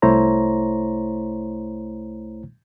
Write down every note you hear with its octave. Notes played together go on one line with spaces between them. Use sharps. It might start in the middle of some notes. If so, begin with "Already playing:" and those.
C2 A3 E4 C5 C#5 A#5